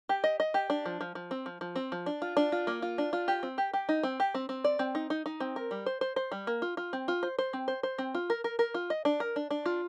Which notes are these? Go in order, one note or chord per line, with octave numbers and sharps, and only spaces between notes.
G4
D#5
D#5
G4
D4
F3
F3
F3
C4
F3
F3
C4
F3
D4
F4
D4
F4
A#3
F4
D4
F4
G4
C4
G4
G4
D#4
C4
G4
C4
C4
D5
C4
D#4
D#4
D#4
C4
A#4
G3
C5
C5
C5
G3
A#3
F4
F4
C4
F4
C5
C5
C4
C5
C5
C4
F4
A#4
A#4
A#4
F4
D#5
D4
A#4
D4
D4
F4